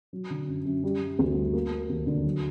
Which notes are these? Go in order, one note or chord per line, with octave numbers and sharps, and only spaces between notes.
F#3
D3
F#2
F#2
G3
G3
D2
G3
A#3
A#3
D#2
D3
F#3